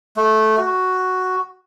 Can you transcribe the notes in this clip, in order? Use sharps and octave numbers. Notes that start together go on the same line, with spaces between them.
A3
F#4